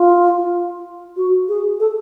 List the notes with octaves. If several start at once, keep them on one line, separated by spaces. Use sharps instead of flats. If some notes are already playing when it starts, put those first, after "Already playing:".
Already playing: F4
F#4
G#4
A4